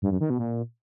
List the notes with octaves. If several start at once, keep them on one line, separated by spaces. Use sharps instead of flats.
G2
F#2
D#3
B2
A#2